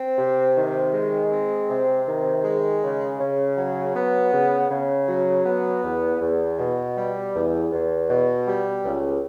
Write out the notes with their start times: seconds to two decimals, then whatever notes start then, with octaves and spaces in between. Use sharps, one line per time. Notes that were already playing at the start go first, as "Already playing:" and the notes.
Already playing: C4
0.18 C3
0.57 D#3
0.93 G#3
1.32 C4
1.70 C3
2.07 D#3
2.44 G#3
2.83 C#3
3.20 C#3
3.57 F#3
3.95 B3
4.33 C#3
4.71 C#3
5.08 F#3
5.46 B3
5.84 E2
6.21 E2
6.59 B2
6.97 G3
7.34 E2
7.72 E2
8.09 B2
8.47 G3
8.85 C#2